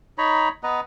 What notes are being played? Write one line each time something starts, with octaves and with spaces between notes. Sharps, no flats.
D#4 C#5 A#5 B5
B3 B4 D#5 A#5